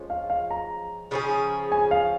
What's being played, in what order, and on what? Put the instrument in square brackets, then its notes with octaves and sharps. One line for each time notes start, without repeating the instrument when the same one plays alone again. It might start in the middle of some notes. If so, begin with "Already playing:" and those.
Already playing: [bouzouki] F3 G#3 C#4
[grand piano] F5
F5
A#5
[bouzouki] C#3 F3 C#4 G#4
[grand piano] G#5
F5